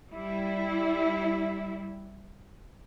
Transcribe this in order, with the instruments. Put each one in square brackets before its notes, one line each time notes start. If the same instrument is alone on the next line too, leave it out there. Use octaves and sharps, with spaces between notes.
[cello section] G3 E4